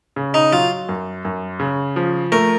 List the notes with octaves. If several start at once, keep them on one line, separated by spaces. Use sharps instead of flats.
C#3
D#4
F#3 F4
F#2
F#2
C#3
F3
A3 A#4